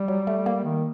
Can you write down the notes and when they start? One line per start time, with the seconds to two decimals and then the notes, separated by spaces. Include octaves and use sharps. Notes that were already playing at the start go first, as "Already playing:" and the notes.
Already playing: G3
0.08 F#3
0.27 A3
0.46 A#3
0.64 D#3